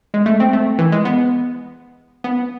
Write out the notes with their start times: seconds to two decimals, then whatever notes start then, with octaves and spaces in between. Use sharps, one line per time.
0.14 G#3
0.26 A3
0.40 C4
0.53 A3
0.79 E3
0.92 G#3
1.05 B3
2.24 B3